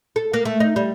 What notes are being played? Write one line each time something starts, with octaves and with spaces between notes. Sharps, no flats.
A4
A#3
A3
D#4
G3